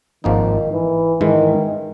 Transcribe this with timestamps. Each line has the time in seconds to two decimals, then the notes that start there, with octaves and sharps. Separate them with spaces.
0.24 G#1 G#2 D#3 F3 A#3 D#4
0.72 E3
1.21 G#2 D#3 E3 G#3